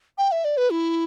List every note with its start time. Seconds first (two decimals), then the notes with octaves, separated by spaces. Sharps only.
0.18 G5
0.32 E5
0.45 D5
0.57 B4
0.70 E4